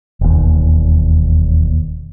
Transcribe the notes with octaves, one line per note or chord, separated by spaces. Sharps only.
E1 D#2